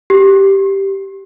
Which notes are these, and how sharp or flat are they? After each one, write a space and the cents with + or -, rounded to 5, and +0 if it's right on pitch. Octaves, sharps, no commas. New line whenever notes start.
G4 -5